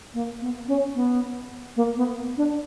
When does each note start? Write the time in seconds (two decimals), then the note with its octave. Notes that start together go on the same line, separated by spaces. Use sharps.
0.14 A#3
0.41 B3
0.68 C#4
0.95 B3
1.76 A#3
1.97 B3
2.37 D4